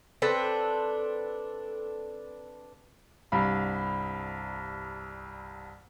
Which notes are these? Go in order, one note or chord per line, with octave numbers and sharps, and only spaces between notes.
C4 D4 A4 B4
C2 G2 F5 A#5 B5